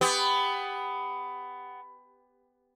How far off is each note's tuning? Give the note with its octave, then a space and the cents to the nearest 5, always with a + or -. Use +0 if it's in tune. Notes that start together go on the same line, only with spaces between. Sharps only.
B3 +15 G4 +20